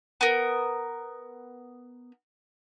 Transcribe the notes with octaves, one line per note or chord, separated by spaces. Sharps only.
B3 A#4